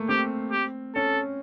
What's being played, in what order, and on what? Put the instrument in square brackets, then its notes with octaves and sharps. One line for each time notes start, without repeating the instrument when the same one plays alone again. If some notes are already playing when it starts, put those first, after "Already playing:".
Already playing: [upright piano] A3 A#3
[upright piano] C4 [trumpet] G4
[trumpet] G4
[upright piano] C#4 [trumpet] A4